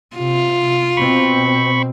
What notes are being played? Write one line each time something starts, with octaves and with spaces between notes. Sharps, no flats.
C3 F4
B2 C4 B5 C#6